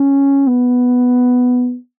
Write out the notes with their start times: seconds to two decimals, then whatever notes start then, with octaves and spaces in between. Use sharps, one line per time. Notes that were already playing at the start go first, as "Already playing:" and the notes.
Already playing: C#4
0.47 B3